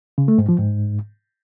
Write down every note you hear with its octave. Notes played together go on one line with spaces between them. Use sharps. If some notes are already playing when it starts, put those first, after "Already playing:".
C#3
A3
G#2
F3
G#2